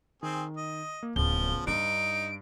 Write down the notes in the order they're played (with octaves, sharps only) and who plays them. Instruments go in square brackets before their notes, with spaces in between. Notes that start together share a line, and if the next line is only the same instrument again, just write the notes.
[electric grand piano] D#3 [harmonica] C4 G#4
[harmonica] D#5
[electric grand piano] A#3
[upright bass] D1 [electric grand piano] C#3 B3 [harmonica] F3 [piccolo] G7
[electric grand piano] G2 [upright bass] D4 [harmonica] D#4 [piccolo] D7